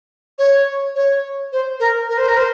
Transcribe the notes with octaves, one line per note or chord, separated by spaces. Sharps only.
C#5
C#5
C5
A#4
A#4
C5
A#4
C5